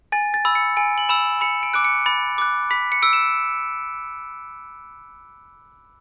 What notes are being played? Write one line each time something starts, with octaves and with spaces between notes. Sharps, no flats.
G#5 A6
A6
B5 E6
C#7
G#5 D7
F#7
B5 E6 E7
B5 C#7
D7
D6 F#6 D7
C#7
B5 A6
D6 F#6
B5 B6
C#7
E6 D7
E7